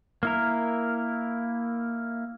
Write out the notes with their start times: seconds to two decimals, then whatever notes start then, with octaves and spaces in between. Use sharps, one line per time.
0.23 A#3 E4 A#4